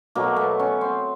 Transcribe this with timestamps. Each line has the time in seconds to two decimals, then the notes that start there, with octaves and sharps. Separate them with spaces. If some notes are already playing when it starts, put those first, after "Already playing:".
0.15 B2 F#3 A3 A#3
0.36 B3
0.59 C#4
0.81 C4